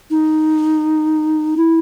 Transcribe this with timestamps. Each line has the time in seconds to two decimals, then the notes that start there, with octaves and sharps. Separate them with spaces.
0.11 D#4
1.57 E4